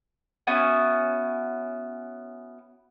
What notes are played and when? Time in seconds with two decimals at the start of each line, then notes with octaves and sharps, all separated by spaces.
0.47 B3 C#4 E4 F#4